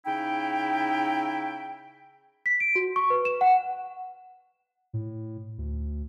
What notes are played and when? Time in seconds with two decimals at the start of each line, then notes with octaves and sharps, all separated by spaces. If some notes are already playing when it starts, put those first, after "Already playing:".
0.06 C#3 D#4 E4 G5
2.46 B6
2.60 D7
2.75 F#4
2.96 C#6
3.10 B4
3.25 E7
3.41 F#5
4.93 A2
5.58 D2